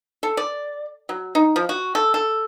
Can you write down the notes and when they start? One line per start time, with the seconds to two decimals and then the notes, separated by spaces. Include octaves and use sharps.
0.23 A4
0.37 D5
1.09 F#3
1.35 D#4
1.56 F3
1.69 F#4
1.95 A4
2.14 A4